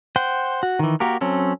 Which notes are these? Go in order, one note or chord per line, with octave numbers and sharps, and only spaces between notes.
C5 F#5 G5
F#4
D#3 E3
A#3 F#4 G4 A#4
F#3 C4 C#4 A4